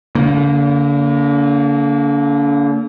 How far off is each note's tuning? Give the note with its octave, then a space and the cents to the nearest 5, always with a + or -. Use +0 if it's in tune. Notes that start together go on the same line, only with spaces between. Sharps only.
D3 -40 A#3 -10